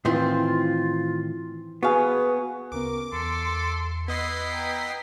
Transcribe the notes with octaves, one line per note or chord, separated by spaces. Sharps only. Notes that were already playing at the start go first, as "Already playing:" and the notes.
A2 D#3 E3 C4 F4 C5
B3 F#4 G#4 B4 F5
D2 C#3 B3 A#4 D6
E2 A4 C6
B3 E4 D#5 C7
G5 A#5